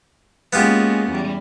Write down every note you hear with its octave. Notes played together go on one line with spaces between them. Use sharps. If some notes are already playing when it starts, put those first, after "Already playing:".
G#3 A#3 B3 C#4 F4 G4
E2 G3